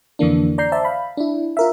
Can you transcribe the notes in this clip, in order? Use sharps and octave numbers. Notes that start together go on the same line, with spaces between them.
F2 D3 E3 A#3 D4
D5 A#5 G6 C7
C5 D5 E5 A5
F5 B5
D4 E4
F4 A#4 E5